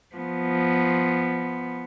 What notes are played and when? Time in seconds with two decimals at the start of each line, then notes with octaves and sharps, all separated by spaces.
0.16 F3 B3